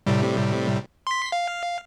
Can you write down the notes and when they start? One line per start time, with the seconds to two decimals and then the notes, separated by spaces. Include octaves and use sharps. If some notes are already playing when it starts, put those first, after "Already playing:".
0.06 A2 C3 G3
1.07 C6 B6
1.32 F5